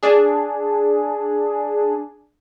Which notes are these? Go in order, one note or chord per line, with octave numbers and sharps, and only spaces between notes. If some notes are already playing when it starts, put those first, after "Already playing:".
D4 G#4